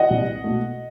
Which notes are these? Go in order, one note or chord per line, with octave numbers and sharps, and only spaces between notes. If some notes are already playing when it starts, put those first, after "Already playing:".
Already playing: D#5 F#5
C2
B2 A3